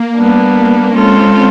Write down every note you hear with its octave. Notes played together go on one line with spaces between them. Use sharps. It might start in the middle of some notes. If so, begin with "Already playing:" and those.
Already playing: A#3
G3 B3 D4
G#3 C4 C#4 F4 A4